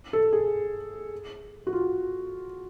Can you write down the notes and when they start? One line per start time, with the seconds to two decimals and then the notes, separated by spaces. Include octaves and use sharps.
0.13 A4
0.33 G#4
1.67 F#4
1.73 F4